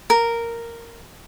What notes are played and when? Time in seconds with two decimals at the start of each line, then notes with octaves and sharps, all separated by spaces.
0.10 A#4